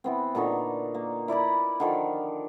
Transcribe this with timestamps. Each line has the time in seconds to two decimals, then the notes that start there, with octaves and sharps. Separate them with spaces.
0.04 E3 B3 C4
0.35 A#2 D3 D#4 C#6
0.94 A#3
1.28 E4 D5 A#5 B5
1.80 D3 D#3 F3